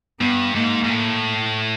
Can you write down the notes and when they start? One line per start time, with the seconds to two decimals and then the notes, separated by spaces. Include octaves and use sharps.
0.20 G2 B3
0.54 G#2 A#3
0.84 G#2
0.89 A2